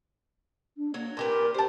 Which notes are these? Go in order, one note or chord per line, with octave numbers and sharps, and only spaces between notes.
D4
F#3 A#3
A#2 G4 A#4 B4
G4 C5 A5